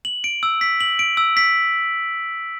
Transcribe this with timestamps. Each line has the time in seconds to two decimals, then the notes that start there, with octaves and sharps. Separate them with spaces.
0.05 F#7
0.24 D7
0.43 E6
0.61 B6
0.81 F#7
0.99 D7
1.17 E6
1.37 B6